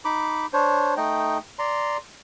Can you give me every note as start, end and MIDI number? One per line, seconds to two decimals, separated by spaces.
0.05 0.46 63
0.05 0.46 83
0.05 0.46 86
0.53 0.94 62
0.53 0.94 72
0.53 0.94 73
0.97 1.38 57
0.97 1.38 63
0.97 1.38 75
0.97 1.38 79
1.59 1.97 74
1.59 1.97 82
1.59 1.97 84